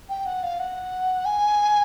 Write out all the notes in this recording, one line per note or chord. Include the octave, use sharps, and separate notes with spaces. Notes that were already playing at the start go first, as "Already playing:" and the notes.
G5
F#5
F5
F#5
G#5